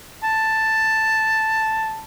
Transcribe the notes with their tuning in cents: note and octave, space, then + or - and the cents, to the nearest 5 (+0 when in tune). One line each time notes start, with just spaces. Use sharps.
A5 +5